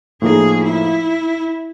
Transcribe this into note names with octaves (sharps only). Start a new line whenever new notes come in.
A2 F3 A#3 D#4 G#4
E4